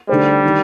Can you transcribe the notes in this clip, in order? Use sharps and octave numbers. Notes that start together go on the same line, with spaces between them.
D3 G3 A3 D#4 G4 C5
D#3